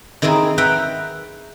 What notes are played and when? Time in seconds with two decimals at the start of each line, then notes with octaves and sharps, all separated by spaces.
0.22 D#3 C4 E4 G#4 A#4
0.58 B4 E5 F#5 G5 A#5 B5